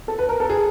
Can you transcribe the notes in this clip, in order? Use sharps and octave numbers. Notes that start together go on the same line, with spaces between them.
A4
B4
A#4
A4
G#4